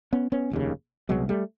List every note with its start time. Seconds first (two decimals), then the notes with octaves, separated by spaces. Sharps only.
0.13 B3 C#4
0.32 B3 C#4
0.51 F1 D#2 C#3
1.09 C2 B2 F#3 G#3
1.29 G3 A3